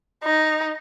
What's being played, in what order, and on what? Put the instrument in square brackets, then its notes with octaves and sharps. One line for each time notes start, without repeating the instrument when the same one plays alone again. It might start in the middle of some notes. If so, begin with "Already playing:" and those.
[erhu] D#4